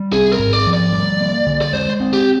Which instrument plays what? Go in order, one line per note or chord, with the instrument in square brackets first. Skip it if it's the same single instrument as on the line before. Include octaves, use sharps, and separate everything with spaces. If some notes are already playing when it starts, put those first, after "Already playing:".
Already playing: [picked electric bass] G3
[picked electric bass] C4 [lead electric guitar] G#4
[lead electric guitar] A#4
[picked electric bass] G#2
[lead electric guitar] D5
[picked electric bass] F3
[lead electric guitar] D5
[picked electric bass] G3
A#3
D3
[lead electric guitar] D5
[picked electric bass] G#3 [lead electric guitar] C5
[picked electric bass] C4
[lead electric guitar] G4